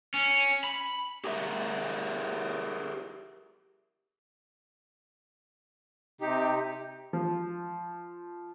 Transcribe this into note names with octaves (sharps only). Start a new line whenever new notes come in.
C#4
B5
G4 G#4 A#4 D#5 E5
C3 D#4 G4
F3